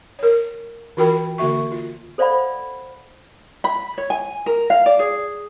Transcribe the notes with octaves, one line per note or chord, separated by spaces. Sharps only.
A#4 C#5
E3 F4 F#4 A#4 G5 B5
D3 A#3 F#4 E5 C#6
F4
A4 C5 D5 F5 F#5 B5
B5
C#5
G#5
A#4
F5
D5
G#4